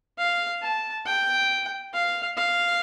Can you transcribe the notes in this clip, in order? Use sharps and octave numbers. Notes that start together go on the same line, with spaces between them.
F5
A5
G5
F5
F5